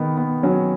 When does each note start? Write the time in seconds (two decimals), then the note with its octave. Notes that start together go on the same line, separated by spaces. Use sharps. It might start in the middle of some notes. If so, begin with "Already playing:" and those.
Already playing: D#3 B3
0.17 B3
0.43 F#3 C#4